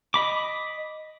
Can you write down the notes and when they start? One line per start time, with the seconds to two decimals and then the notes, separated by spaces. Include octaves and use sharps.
0.14 D#5 B5 D6